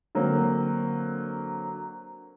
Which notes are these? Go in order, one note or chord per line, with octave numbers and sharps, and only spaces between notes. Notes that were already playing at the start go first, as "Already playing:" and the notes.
D3 F#3 A#3 C4